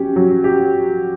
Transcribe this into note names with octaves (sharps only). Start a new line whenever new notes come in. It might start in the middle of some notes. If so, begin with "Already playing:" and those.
Already playing: F#3 C#4 G4
F#3
G4